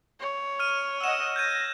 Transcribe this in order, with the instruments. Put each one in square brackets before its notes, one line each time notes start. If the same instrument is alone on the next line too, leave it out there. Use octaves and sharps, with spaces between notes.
[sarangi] C#5
[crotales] F6 D#7
[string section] D#5 F#5 [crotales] E6 E7
[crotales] G6 G#6 D#7 [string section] A#6